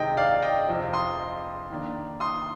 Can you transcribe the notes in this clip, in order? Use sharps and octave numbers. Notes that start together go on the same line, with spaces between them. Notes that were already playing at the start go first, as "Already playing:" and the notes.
Already playing: C3 D#3 G#3 D#4 D#5 G5
D5 F5
D#5 G5
F2 C3 F3
C6 D#6
D#3 A#3 D4
C6 D#6